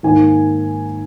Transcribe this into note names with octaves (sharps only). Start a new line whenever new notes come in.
G#2 D#3 A#3 D#4 G#5